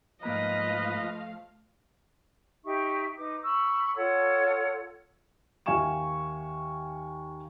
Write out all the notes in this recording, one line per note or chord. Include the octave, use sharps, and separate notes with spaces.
G#2 F3 A3 A#3 B4 D#5 F5 A#5
D#4 G4 E5 C#6
D#4 B4 D6
B5 C#6 E6
F4 A4 C#5 F#5
D#2 E5 F5 G#5 C#6 E7